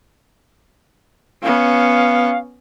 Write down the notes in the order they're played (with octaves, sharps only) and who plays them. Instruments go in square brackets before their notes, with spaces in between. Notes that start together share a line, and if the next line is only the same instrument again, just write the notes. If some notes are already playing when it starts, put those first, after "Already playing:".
[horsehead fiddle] B3 C#4 [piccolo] F5